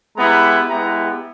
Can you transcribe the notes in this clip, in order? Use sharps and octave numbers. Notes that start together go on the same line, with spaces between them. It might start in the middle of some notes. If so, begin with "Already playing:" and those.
G#3 B3 E4 G4 A#5
G#3 B3 E4 G4 A#5